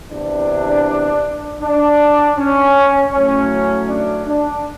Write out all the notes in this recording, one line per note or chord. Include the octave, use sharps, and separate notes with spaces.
E2 C3 E3 D4
D4
C#4
A2 F#3 A3 C#4
D4
D4